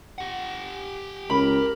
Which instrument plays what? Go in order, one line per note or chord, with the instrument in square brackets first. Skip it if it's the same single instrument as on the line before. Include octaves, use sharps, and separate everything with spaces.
[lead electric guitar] G4 F#5
[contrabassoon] C#2 [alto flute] A#4 [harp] B5